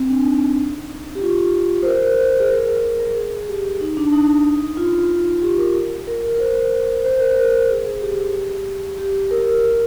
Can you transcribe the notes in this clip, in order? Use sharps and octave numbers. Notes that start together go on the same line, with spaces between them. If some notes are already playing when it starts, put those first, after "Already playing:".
Already playing: C4
D4
D#4
G4
F4
C5
A#4
C5
G#4
A#4
A#4
A#4
G#4
G4
D#4
D4
D#4
F4
F4
G4
A#4
A#4
A#4
C5
C5
A#4
A#4
G#4
G#4
G4
G4
A#4
A#4